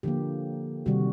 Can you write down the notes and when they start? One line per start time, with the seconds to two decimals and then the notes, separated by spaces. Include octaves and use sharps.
0.03 D3 F3 A#3 G4
0.86 C3 D#3 G3 F#4